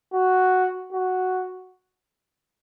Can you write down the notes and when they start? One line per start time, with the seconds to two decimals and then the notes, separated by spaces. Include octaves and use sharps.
0.14 F#4
0.93 F#4